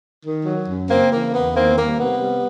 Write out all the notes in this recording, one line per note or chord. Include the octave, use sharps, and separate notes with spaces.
D#3
F#3
F#2
C#3 A#3 C4
E3 A#3
E2 B3
D#3 A#3 C4
G3 A#3
C3 B3
G3